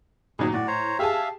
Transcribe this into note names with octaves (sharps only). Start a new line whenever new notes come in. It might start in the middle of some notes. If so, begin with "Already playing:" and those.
A#2 D#3 F#3 D#4 G#4
A2 F#4 D5
C5 C#5 A#5
G4 G#4 E5 F5 A5